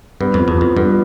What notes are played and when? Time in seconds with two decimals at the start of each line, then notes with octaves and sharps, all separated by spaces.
0.20 G2 B3
0.34 F2 F3
0.48 E2
0.58 F2 F3
0.77 G2 B3